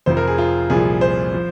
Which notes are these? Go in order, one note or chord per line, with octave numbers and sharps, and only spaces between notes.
F1 F2 F3 C5
A#4
G#4
F4
C2 A#2 F3 G#4
C5
F3